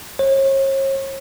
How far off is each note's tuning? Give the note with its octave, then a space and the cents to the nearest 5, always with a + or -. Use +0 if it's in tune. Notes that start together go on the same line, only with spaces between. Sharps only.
C#5 -40